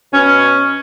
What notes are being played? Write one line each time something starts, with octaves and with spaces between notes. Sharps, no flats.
B2 C#4